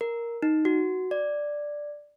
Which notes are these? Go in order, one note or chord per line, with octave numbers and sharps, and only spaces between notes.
A#4
D#4
F#4
D5